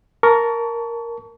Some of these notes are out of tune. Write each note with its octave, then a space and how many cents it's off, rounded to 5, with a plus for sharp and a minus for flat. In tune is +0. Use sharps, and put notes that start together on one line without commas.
A#4 +0 A5 +0 C#6 +30